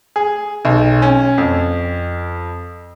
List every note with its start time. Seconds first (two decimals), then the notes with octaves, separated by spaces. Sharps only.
0.16 G#4
0.65 B1
1.02 C#4
1.38 F2